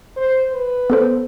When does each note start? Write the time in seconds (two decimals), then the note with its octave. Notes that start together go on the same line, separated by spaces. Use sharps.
0.16 C5
0.52 B4
0.90 B3 A4 C5